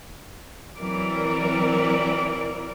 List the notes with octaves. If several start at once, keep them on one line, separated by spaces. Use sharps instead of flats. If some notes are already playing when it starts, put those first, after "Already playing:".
E3 F#3 C4 E4 A#4 D5